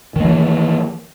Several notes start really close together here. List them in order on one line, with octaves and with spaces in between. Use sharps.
D#3 A#3 E3